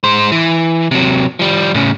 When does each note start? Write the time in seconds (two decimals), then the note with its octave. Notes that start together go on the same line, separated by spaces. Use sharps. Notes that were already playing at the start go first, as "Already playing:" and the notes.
0.04 G#3 C5
0.32 E3
0.91 C3 F#3
1.39 F3 G3
1.74 A2 C#3